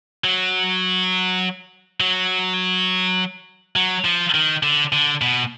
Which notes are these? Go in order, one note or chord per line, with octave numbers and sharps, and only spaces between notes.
F#3
F#3
F#3
F3
D#3
D3
D3
B2